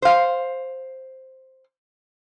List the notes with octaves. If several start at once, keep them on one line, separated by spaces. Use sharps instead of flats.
C5 F5